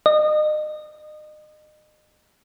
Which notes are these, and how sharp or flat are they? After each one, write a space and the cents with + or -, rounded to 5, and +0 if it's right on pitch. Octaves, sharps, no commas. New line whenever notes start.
D#5 -35